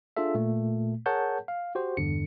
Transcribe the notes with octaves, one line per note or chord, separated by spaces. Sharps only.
D4 F4 G#4 A4 E5
A#2 A3
G#4 A#4 C#5 F#5 A5 G6
F5
F#4 G4 C5
E2 G2 D3 C#7